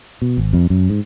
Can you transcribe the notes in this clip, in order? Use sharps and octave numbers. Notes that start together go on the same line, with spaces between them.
B2
G#1
F2
F#2
G#2